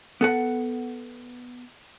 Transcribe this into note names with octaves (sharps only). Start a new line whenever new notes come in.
B3 A4 F#5